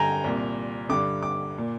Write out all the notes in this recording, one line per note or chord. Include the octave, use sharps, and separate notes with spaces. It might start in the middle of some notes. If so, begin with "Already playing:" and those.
Already playing: G2 D3 G5 G#5 A#5
C2 A#2
G2 D3 D6
D6
A#2